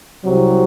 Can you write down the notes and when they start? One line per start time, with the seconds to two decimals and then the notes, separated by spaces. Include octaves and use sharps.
0.24 C2 C3 F#3